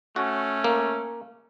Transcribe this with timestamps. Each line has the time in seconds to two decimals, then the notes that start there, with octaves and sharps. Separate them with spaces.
0.16 A3 C#4 F#4
0.64 A#3